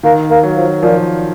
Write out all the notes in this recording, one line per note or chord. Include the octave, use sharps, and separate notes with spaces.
D#3 A#3
A#3
F#3
F3
A#2 F3